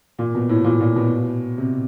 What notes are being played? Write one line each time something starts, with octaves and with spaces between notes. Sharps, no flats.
A#2
B2
A2
A#2
A#2
B2
C3